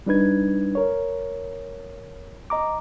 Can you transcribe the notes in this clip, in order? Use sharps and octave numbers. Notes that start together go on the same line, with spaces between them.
G3 D4 D#4 B4 G#6
A#4 C#5
D#5 A#5 D6